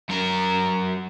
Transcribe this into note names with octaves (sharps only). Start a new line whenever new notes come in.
F#2 A#4